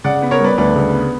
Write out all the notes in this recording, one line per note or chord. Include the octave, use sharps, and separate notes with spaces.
C#3 D5 F#5
B3
A#4 C#5
G3 B4 D5
D2 B4 D5
C#3
B3